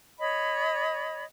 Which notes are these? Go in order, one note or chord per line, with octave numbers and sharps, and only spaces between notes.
C#5 D#5 B5